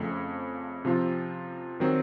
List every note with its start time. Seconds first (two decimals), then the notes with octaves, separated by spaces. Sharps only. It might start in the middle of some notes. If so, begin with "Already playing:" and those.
Already playing: F2 C#3 A3 C4
0.85 C3 F3 C4 F4
1.80 D#3 F#3 C4